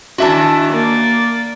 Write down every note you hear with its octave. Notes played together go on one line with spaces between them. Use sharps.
D#3 E3 D4 F#4 E5 A5
A#3 D5